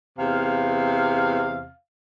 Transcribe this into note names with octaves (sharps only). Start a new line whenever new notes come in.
E2 C3 F5